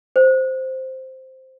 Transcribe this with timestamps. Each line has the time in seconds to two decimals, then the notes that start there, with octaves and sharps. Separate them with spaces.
0.16 C5